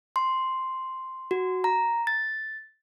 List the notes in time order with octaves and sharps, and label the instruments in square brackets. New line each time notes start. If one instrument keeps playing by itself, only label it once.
[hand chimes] C6
F#4
A#5
A6